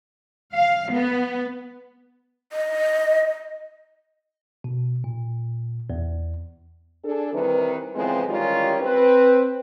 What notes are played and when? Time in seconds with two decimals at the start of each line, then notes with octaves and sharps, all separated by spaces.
0.54 F5
0.92 B3
2.52 D#5
4.64 B2
5.04 A#2
5.90 E2
7.05 D4 G#4 A4
7.33 C3 D#3 E3 G3 B4
7.95 F2 C#3 E3 G#3 B3 C4
8.28 D#3 E3 G3 G#3 C#4 F4
8.80 C4 B4